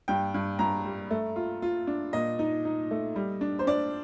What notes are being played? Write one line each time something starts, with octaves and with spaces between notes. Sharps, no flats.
G2 G5
G2
G2 A#5
G3
A3
F4
F4
D4
A#2 D#5
D#4
D#4
A3
G3
D4
C5
D4 D5